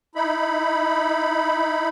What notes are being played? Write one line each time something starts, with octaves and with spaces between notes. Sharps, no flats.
D#4 E4 B5